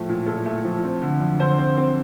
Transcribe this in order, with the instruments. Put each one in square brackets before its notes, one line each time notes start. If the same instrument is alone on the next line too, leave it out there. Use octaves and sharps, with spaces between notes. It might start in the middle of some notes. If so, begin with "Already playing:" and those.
Already playing: [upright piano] A2 F3 A3
A#2
A#2 A4
A3
F3
C4
D3
F2
D3 C5
C4
C4